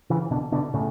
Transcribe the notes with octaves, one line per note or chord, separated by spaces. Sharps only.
C#3 E3
B2 D3
B2 D3
A2 C#3